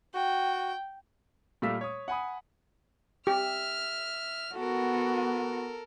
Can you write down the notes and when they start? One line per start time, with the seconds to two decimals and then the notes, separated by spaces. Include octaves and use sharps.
0.15 F#4 G5
1.62 A#2 G3 A3 F5 E6 B6
1.81 C#5 D#6
2.08 F#5 G#5 B5 D#6
3.27 G4 E5 F6
4.55 B3 F#4 A4 A#4